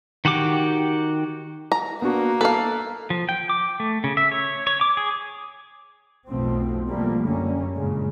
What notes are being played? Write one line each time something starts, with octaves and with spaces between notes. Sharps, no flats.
D#3 F#4 G4 D6
A#5
A#3 B3 D4 F#4
A4 B4 F5 A5
F3
G5
D6
A3
C#3
E5
C#5
C#5
D6
G#4
B1 F2 B2 F3 A3 C4
B2 F3 G3 A3 A#3
F#2 D3 G3 A#3 C#4
G2 A#2 C#3 G#3